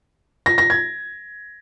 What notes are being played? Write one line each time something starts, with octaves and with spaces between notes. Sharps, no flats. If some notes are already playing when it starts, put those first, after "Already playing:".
A#6
A#6
G#6